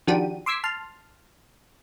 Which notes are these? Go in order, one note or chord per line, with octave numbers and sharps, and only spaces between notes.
D#3 F3 D4 F#4 G4 D#7
C6 D6 E6 G#6 B6 C7
A5 C6 F6